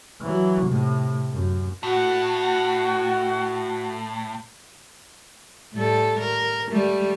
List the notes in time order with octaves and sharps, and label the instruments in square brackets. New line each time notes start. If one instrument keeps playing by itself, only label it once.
[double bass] E3 F#3
A2 C3
F#2
[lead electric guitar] A2 [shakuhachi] F#4
[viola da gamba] A2 G3 A4
A#4
G3 A3